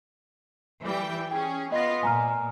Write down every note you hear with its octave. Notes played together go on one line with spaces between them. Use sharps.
E3 G3 G5
C#4 G#4 G5
B3 F4 D#5 A#6
A#2 G#5 A#5 F6